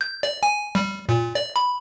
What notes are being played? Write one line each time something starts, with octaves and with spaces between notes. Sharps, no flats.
G6
D5
G#5
G3
A#2
D5
B5